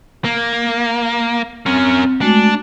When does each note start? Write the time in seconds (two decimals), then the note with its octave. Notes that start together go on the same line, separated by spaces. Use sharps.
0.24 A#3
1.66 C4 C#4 A#4
2.21 G#3 A3 D4 F#4